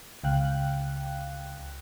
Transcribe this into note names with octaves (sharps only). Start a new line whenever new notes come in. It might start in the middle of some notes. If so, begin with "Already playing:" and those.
C#2 F5 G5 F#6